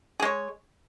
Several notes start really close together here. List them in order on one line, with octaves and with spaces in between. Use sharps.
G#4 G#3 C#5